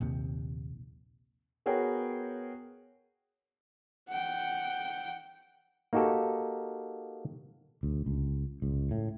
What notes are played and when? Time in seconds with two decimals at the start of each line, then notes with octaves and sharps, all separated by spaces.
0.01 A#1 D#2 C3
1.66 B3 F#4 G#4 A#4 C#5 G5
4.09 F#5 G5
5.93 A#3 D#4 F#4 G4 A4
7.83 D2
8.06 C#2
8.62 C#2
8.91 A2